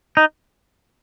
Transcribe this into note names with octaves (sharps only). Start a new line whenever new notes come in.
D#4